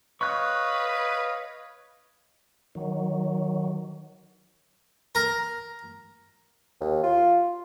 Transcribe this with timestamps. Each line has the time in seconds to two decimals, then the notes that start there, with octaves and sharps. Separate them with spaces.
0.21 B4 C#5 D#5 F5 C#6 F#6
2.75 D#3 F#3
5.15 A#4
6.81 D#2
7.03 F4